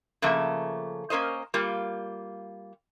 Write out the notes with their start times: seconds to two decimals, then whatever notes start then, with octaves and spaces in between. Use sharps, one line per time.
0.22 C#3 F3 A3 A#3 E5
1.10 A#3 C#4 A#4 C5 D#5
1.54 G3 A#3 F4